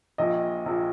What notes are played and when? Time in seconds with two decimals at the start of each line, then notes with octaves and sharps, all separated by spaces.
0.18 A#1 A#2 D#5
0.66 A#1 A#2